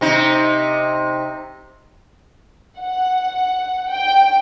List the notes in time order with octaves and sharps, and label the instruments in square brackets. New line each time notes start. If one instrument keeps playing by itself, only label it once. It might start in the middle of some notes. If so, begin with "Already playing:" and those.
[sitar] C3 D#4
[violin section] F#5
G5